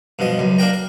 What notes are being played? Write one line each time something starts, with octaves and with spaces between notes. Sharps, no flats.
G2 B2 F3 D#5
C#2 F#2
A#3 D4 A#4 G5 A#5
A#4